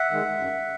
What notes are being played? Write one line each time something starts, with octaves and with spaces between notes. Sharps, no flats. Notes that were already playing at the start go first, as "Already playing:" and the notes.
Already playing: E5 F#5
D#3 G#3
F#2